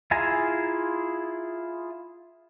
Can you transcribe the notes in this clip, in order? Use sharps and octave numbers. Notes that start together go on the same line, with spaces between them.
E4 F4 G#4 G#5 A#5